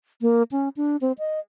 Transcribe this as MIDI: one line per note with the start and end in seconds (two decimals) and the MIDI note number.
0.21 0.43 58
0.52 0.69 61
0.77 0.97 62
1.01 1.12 60
1.19 1.39 75